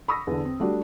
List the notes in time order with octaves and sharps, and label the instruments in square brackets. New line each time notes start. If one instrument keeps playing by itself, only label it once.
[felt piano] B5 C#6 D#6 E6 A#6
E2 D3
C4
G3 A3 D4 F#4